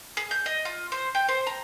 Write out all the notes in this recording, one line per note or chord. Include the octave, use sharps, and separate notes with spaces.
G#4
G6
D#5
F4
C5
G5
C5
A#5